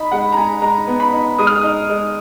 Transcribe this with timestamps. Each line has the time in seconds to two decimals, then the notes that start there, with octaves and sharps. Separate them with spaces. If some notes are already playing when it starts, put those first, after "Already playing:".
Already playing: D#4 B5
0.12 G#3 F#5
0.32 A#5
0.37 G#3 G#5
0.62 G#3 A#5
0.87 B3
1.00 B5
1.13 D#4
1.39 G#3 D#6
1.47 F6
1.57 D#6
1.63 D#4
1.90 G#3